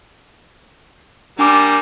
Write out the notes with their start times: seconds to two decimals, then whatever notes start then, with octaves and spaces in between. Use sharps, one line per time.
1.39 G3 A#3 D4 G#5 D6